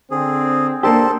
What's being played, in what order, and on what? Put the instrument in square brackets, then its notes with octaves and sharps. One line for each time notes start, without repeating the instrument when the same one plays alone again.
[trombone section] D3 C4 [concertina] G#4
[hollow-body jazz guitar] A#3 D4 G4 [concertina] A4 C5